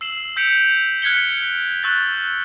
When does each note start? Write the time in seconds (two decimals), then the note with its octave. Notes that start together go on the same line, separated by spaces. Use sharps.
0.01 E6 C7 E7 F#7
0.36 E6 G6 B6 C#7 D7 F7
1.02 F6 F#6 G#6 B6 C#7 G7
1.83 C#6 E6 F#6 A6